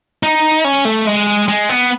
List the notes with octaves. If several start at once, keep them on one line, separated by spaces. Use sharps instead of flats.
D#4
C#4
A3
G#3
G#3
B3